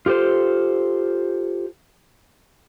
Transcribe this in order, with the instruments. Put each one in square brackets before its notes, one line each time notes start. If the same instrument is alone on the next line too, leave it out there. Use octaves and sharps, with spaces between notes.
[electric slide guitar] F4 G4 A4 C5